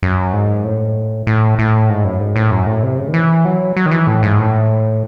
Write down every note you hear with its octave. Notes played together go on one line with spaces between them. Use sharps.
F#2
G#2
A2
A2
A2
G#2
F#2
G#2
A2
F#2
A2
C3
C#3
D#3
E3
F#3
F#3
D#3
E3
A2
G#2
A2